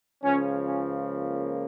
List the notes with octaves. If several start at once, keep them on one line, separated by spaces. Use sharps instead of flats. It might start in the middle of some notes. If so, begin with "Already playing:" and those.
C#2 C#3 F3 C#4
C#4
A#3